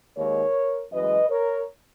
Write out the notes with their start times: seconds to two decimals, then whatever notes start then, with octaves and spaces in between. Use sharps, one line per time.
0.16 D#2 D#3 G#3 A#4 C#5
0.91 F#2 E3 G#3 B4 D#5
1.29 A#4 C#5